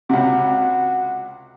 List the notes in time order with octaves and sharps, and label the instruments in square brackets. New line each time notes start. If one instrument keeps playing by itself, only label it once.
[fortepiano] C#2 C3 [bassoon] F#4